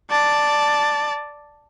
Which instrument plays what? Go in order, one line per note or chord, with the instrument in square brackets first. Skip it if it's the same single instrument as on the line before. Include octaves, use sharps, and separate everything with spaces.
[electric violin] D5 A5